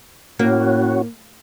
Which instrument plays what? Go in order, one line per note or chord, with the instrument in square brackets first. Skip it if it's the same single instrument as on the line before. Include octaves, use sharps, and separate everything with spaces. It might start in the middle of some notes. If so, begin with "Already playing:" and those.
[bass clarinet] A2 [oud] A#3 [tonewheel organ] C#4 F#4